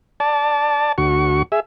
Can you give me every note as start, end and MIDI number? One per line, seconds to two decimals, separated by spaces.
0.20 0.92 74
0.20 0.92 81
0.98 1.42 38
0.98 1.42 66
0.98 1.42 85
1.52 1.60 68
1.52 1.60 76